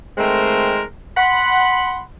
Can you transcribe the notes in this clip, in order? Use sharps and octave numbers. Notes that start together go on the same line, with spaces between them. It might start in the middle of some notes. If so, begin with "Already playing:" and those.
D#3 G#3 A3 C4 A#4 C5
F#5 B5 C6